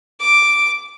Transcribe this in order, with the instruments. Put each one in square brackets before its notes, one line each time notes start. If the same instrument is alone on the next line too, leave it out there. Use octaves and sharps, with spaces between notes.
[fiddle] D6